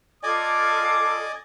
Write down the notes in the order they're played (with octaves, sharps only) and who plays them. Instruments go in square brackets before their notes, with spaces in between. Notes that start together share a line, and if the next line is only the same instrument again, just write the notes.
[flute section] F4 A4 [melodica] D5 D#5 G#5 [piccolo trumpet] D6